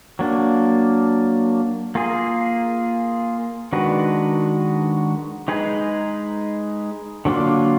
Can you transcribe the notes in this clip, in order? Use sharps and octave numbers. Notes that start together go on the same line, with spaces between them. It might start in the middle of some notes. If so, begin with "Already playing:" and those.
F#3 A#3 D4
A#3 F4 G#4
D#3 G#3 D4 F#4 B4
G#3 D#4 G#4 B4
D3 F#3 A#3 D4 F4